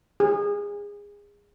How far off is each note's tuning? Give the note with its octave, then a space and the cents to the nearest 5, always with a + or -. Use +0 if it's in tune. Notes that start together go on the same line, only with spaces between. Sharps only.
G#4 -25